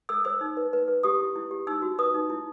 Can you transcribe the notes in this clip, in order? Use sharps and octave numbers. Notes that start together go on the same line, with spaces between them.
A4 E6
C5 E6
D#4
B4
B4
B4
G4 D#6
E4
E4
G4
D#4 E6
F#4
B4 D#6
D#4
E4